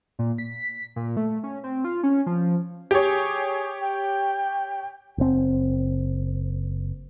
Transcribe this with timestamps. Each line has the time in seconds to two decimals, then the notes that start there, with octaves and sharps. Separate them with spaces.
0.19 A#2
0.38 B6
0.96 A#2
1.17 A3
1.43 C#4
1.64 C4
1.84 F4
2.03 C#4
2.26 F3
2.91 G4 G#4 C#5
3.81 G5
5.18 F#1 C4